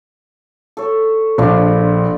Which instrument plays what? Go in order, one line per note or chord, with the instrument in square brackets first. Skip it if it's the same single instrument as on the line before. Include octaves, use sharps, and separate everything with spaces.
[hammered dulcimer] A4 C#5
[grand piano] A#1 [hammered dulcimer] D4 F4 B5